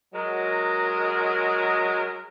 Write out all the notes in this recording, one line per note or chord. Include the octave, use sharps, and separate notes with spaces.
F#3 G#3 A#4